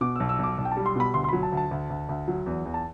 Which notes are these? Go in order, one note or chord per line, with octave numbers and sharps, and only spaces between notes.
B2 D6
B1 E6
E6
B1 D6
B1
G5
A5
G3
C6
B2 B5
D2 C6
C6
F#3 B5
A5
D2
A5
D2
D2
D2
F#3
E2
E2
A5